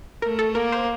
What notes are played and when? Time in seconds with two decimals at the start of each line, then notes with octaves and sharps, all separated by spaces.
0.22 A3 A#4
0.39 A4
0.55 A#3 A#4
0.72 C5